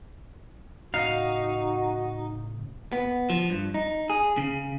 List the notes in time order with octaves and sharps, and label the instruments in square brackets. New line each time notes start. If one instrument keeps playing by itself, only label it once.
[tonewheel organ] A2 C#3 [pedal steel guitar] D#4 [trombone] F#4 [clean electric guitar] F5
[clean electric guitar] B3
F3
G2
D#4
G#4
C#3